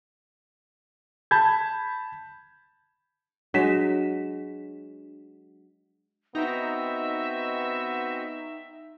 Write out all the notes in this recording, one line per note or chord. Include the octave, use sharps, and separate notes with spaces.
A5 B5 G6 G#6
F#3 G#3 D4 B6 E7
B3 C4 D#4 F#4 D#5 E5 G5 A#5